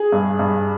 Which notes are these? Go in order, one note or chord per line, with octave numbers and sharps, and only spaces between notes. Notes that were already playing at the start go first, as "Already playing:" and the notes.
Already playing: G#4
G2
G2